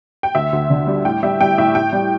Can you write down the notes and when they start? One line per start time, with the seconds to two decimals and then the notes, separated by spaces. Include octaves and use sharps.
0.23 G5
0.35 D2 E5
0.53 D2
0.70 D3
0.87 G3
1.05 A2 G5
1.23 G3 E5
1.41 G3 G5
1.58 A2 E5
1.75 A2 G5
1.93 G3